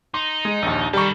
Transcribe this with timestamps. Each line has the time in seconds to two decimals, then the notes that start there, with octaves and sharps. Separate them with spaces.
0.14 D#4 C6
0.45 G#3
0.62 A#1 D#2
0.93 D#3 G3 A4 A#5 C#6